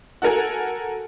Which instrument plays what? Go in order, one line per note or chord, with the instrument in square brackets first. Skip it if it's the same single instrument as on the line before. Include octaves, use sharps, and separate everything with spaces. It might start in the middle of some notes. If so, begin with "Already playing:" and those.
[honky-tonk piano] F#4 A4 A#4 G#5